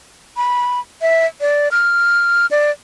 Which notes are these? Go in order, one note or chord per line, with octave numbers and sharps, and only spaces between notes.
B5
E5
D5
F6
D5